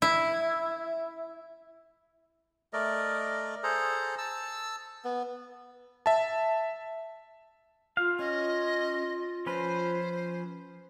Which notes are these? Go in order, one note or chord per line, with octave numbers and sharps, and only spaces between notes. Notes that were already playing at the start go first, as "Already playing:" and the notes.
E4
A3 A#4 D5 D#5
G#4 A4 C5 A#5
A5 E6
B3
E5 A5
F4 F5
C#4 D#5
F3 C#4 B4 C5